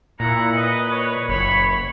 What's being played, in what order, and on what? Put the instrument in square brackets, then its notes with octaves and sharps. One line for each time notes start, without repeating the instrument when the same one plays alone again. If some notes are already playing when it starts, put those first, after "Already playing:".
[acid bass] A#2 [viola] E4 F#5 [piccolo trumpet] A#5
[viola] B4 [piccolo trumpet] D#5
[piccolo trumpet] C#5
[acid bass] F#1 [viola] C#5 [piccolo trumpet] B5